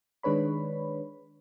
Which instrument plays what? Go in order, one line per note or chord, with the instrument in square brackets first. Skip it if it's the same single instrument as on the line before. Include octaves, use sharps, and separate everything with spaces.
[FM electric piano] D#3 G#3 D4 B4 C#5 B5